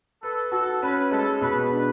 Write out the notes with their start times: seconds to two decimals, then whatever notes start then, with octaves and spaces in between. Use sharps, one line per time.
0.23 A4 B4
0.52 F#4 A4
0.82 C#4 B4
1.11 G#3 A4
1.41 B2 B4
1.71 D4